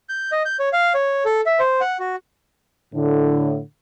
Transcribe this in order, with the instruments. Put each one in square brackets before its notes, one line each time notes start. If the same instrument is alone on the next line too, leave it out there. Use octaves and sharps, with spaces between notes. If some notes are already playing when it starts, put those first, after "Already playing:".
[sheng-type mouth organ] G6
D#5
G6
C#5
F5
C#5
A4
E5
C5
F#5
F#4
[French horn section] A2 D3